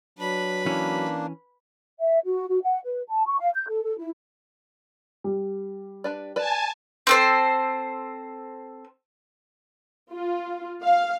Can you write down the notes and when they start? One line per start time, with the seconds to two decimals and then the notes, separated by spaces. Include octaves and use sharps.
0.19 F#3 D4 B4 B5
0.66 E3 A#3 C#4 D4
2.00 E5
2.25 F#4
2.48 F#4
2.63 F#5
2.84 B4
3.08 A5
3.26 C#6
3.40 F5
3.54 G6
3.68 A4
3.83 A4
3.99 E4
5.24 G3
6.04 D4 B4 D5
6.36 B4 D5 G#5 A5
7.07 C4 A4 C5
10.12 F4
10.83 F5